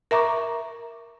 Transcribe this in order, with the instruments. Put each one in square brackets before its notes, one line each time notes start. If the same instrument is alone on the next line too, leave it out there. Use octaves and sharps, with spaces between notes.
[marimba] A#4 E5 A#5 C#6 D6